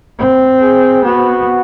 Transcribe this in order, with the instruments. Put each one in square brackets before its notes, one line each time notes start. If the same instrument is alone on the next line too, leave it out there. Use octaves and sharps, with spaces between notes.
[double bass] C4
[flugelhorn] G#4
[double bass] B3 [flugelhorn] F#4